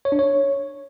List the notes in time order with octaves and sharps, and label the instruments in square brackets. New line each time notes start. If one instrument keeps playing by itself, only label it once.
[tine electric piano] C#5
D4
C#5